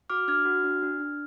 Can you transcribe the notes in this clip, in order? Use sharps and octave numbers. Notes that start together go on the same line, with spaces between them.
F#4 D6 F6
D4 F6 G#6
F#4
D4
D4
D4